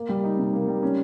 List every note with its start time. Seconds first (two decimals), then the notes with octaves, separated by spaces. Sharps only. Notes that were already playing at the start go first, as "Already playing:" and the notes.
Already playing: A#3
0.09 G3
0.24 D#4
0.38 C3
0.53 A#3
0.68 G3
0.83 C#4